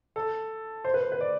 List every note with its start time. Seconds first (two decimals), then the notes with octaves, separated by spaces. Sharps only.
0.16 A4
0.84 C5
0.94 B4
1.02 C5
1.12 B4
1.21 D5